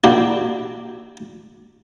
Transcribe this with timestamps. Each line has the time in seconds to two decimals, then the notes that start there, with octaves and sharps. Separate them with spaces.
0.04 A#3 D4 E4 F#4 G4